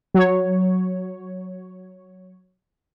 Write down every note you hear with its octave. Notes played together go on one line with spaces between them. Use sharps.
F#3 C#5